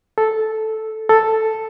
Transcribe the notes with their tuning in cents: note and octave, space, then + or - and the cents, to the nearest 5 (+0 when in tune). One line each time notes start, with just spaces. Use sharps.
A4 -5
A4 +5